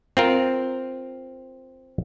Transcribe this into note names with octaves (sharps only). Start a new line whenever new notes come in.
C4 F4 A#4